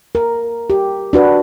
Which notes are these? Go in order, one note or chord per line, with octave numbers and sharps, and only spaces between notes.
A#4
G4
D4 F#4 B4